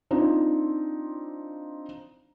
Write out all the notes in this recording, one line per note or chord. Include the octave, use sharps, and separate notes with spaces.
C4 D4 D#4 F4 C5